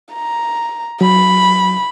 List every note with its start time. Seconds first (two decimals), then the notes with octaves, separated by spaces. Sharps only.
0.14 A#5
1.01 F#3 B5